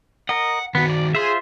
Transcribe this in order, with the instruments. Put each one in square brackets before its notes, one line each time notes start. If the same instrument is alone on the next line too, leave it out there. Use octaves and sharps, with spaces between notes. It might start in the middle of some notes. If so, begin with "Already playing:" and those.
[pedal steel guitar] A#4 D#5 [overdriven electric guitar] F#5
[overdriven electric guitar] D#3 F#4 [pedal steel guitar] B3
[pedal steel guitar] D5
[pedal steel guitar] F4 C5 E5 [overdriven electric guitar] G#4